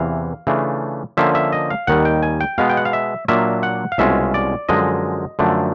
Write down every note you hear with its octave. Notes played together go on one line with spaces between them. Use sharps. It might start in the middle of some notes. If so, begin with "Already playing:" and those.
Already playing: E2 C3 E3 F5
C#3 E3 A3 D4 F4
D3 F3 A#3 C#4 F4 E5
E5
D#5
F5
D#2 D#3 G3 F#5
G5
G#5
G5
B2 G#3 B3 F5
G5
F#5
F5
E5
A#2 F#3 A#3 D4 F4 E5
F#5
F5
C2 B2 G#3 C#4 F4 E5
D5
F#2 D3 F3 G#3 D#5
F#2 D3 F3 A3 D4